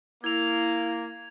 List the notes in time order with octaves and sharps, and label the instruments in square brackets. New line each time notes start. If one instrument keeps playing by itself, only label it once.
[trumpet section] A#3 [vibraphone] E4 [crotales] G#6 F7